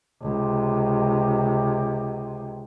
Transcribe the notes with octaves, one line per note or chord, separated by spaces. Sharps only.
C#2 C3